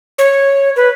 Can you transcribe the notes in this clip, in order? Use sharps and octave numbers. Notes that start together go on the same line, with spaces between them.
C#5
B4